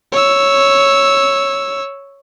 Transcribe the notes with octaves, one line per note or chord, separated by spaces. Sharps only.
C#5 E6